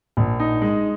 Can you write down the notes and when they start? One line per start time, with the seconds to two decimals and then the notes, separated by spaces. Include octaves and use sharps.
0.17 A#1
0.40 D#4
0.62 G#3